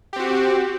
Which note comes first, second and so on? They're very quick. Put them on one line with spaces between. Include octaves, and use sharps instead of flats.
G4 C4 F#4